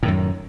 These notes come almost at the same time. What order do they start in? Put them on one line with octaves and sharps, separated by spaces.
A2 D#3 F#2